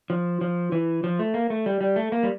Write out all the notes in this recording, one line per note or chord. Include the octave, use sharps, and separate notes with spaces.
F3
F3
E3
F3
A3
A#3
A3
G3
G3
A3
A#3
G3